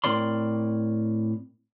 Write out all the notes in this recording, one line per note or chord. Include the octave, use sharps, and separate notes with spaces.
A2 C4 A#4 D5 C6